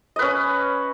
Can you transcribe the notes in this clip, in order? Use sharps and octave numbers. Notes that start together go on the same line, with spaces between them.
C#4 B4 D#5